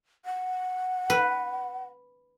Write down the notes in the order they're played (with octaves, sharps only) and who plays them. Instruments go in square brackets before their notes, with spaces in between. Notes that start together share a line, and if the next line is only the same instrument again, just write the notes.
[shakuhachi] F#5
[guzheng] B4